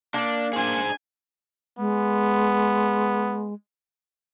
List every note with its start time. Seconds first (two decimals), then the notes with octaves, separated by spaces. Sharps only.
0.14 A#3 D4 A5
0.53 D4 G#4 C5 G#5
1.78 G#3 B3